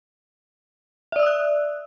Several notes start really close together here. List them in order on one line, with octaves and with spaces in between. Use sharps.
E5 D5 E6 D#6 F#6